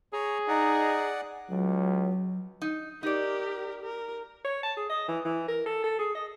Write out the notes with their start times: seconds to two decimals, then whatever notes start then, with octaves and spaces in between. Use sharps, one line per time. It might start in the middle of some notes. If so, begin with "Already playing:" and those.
0.13 G#4 C#5 A#5
0.48 D#4 D5 F#5 A#5
1.49 C#2 F#3
2.62 D#4
3.03 D#4 G4 A#4 D5
3.82 A#4
4.44 C#5
4.63 A5
4.77 G#4
4.89 D#5
5.08 E3
5.25 E3
5.48 A#4
5.66 A4
5.84 A4
5.99 G#4
6.15 D#5